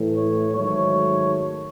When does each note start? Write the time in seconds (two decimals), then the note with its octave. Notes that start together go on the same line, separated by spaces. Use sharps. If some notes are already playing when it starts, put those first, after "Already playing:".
Already playing: A2 E3 A3
0.15 C#5
0.57 G#2 D#3 F#3 A3 C#5